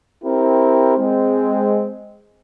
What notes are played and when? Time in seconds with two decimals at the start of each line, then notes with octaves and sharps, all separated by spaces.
0.24 C4 E4 G4 A#4
0.98 G#3 C4